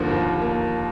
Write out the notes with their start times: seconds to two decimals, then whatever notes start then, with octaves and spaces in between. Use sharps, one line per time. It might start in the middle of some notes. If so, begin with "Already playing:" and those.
Already playing: D#2 D3 F3 A#3
0.11 D#2
0.42 A#3